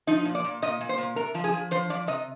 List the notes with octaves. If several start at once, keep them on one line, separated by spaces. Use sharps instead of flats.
F3 D#4
A#2
D5
A#2
A#2 D#5
A#2
C5
A#2
C3 A#4
F3
G#4
F3
F3 C5
F3 D5
C3 D#5